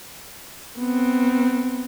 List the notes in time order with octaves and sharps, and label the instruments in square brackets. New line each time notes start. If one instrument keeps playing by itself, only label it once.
[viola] B3 C4